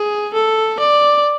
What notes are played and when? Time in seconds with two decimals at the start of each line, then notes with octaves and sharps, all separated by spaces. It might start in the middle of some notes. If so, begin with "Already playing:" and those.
Already playing: G#4
0.33 A4
0.79 D5